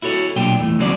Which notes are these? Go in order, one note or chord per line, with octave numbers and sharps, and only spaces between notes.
E4 F#4 A4 C#5
B1 A#2 D4 G4 G5
E2 A2 A3
D#2 C#3 F#3 C4 A4 D5